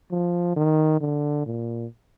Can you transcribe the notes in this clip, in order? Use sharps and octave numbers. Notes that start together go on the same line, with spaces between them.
F3
D#3
D3
A#2